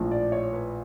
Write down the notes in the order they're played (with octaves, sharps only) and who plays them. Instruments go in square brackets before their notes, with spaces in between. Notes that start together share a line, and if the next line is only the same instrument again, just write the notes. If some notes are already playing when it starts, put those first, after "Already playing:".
Already playing: [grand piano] A#1 A2 F3
D5
C#5
B4